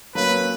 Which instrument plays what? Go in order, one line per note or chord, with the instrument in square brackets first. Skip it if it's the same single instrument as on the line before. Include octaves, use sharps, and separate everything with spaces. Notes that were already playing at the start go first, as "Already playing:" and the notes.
[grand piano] F#3 A#3 C#4 [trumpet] B4